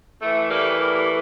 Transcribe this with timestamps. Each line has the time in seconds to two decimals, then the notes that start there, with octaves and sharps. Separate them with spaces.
0.20 A2 E3 A3
0.49 G3 A#3
0.78 G3 A#3